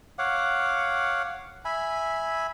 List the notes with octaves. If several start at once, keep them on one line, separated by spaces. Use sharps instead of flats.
C#5 F5 F#5 D6
E5 G#5 B5